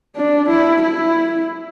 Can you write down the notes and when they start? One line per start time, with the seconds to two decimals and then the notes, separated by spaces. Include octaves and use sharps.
0.16 D4
0.49 E4
0.82 E4